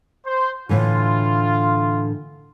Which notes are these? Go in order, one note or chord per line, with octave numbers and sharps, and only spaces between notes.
C5
A2 D3 E3 F4